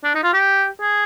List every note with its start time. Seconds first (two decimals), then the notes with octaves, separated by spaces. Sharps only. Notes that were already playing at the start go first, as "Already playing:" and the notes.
0.04 D4
0.15 D#4
0.23 F4
0.33 G4
0.81 G#4